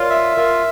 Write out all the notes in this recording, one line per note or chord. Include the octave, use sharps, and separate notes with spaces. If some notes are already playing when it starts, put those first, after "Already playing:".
Already playing: F4 A#4 C#5 D5
E5
F4 A#4